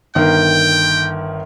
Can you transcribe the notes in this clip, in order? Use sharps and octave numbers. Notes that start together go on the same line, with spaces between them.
G1 D#3 A#4 G5